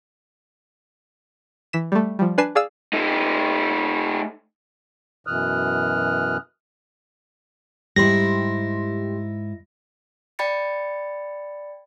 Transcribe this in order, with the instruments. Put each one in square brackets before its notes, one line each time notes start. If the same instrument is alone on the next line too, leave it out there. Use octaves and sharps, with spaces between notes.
[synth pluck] E3 B6 E7
G3 A3
F3 G3
D4 B4 G#5 C7 E7
G#4 D5 F5 G#5 E6
[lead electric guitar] A3 D#4
[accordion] F#2 B2 E3 D#6 F6 F#6
[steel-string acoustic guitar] G#2 E4 [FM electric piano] G3 G4 C6 [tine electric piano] A#6
[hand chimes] D5 G5 B5 A6 C#7